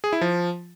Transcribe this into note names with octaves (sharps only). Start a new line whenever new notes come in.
G#4
E4
F3